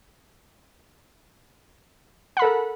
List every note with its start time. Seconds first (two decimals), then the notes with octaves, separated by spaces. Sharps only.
2.37 F#5
2.39 B5
2.42 A4
2.45 A#4